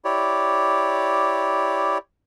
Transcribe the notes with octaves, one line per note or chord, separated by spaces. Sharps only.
E4 G4 C#5 D5